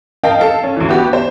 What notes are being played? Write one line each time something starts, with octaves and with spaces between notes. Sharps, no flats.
A#4 D#5 F5 G5 A5
A4 F5
C#4
D2 E3
B3 F#4 G4
C5